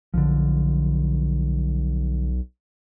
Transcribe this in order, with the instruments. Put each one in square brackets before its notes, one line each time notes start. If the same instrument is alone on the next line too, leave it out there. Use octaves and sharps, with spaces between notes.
[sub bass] B1 [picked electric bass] D3 F3